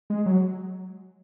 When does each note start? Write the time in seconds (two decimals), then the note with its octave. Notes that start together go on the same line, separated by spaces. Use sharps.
0.10 G#3
0.26 F#3